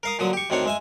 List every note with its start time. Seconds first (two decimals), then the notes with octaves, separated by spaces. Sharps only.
0.03 A#4 F5 D#6
0.19 A#2 D3 F#3 D#6
0.33 G4 C#6
0.50 D2 D#3 C4 D4 C#5
0.65 G#3 E5 G#5